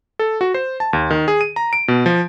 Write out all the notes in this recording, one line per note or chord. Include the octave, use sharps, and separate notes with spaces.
A4
F#4
C5
A5
D#2
D#3
G#4
D#7
A#5
D7
B2
F3